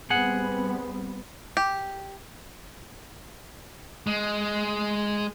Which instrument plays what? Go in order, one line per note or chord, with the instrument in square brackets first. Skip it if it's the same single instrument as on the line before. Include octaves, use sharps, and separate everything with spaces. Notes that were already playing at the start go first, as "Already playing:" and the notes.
[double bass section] G3 B3 C4 [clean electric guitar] G#4 F#5
[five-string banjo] G4
[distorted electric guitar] G#3